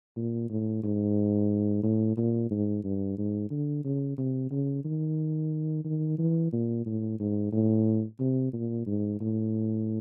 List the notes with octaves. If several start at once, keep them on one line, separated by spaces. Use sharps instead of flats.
A#2
A2
G#2
A2
A#2
G#2
G2
G#2
D3
C#3
C3
C#3
D#3
D#3
E3
A#2
A2
G#2
A2
C3
A#2
G#2
A2